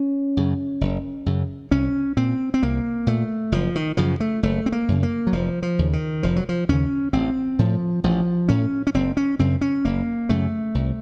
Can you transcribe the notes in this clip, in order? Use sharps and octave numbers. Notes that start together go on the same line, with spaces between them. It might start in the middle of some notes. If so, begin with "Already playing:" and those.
Already playing: C#4
F#2 C#3
F#1
F#2 C#3
C2 C#4
A#2 C4
C4
C2 A#3
A#2 A3
F#1 F3
D#3
F#2 C#3 F3
A3
F#1 A3
C4
A#3
F#2 C#3
A#3
F#3
F1 F3
F3
D#2 C#3
D#3
F1 F3
F#3
F3
D#2 C#3 C#4
A1 C4
A2 F3
A1 F3
A2 C#4
C#4
F#1 C4
C#4
F#2 C#3 C4
C#4
F#1 A#3
F#2 C#3 A3
C2